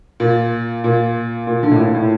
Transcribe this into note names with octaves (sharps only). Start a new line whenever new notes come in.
A#2
A#2
A#2
D3
A2
A#2
A2